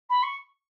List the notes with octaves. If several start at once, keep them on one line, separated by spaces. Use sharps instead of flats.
B5
C#6